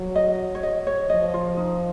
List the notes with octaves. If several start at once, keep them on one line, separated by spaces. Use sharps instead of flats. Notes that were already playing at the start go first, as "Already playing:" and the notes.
Already playing: F#3
D#5
C#5
D#5
C#5
F3 D#5
F4
D#4